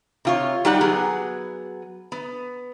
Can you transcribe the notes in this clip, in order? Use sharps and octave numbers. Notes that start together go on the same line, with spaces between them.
C3 F4 C#5
G3 D#4 G4 D5 F#5
F#3 B3 G#4
B3